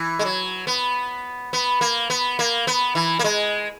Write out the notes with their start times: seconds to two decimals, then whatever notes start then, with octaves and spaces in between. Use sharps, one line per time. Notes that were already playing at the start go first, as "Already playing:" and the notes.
Already playing: E3
0.19 G#3
0.25 F#3
0.67 B3
1.53 B3
1.81 A#3
2.10 B3
2.39 A#3
2.67 B3
2.95 E3
3.19 A#3
3.24 G#3